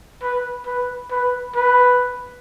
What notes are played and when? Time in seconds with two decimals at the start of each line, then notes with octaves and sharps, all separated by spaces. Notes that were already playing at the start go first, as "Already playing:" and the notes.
0.22 B4
0.66 B4
1.11 B4
1.55 B4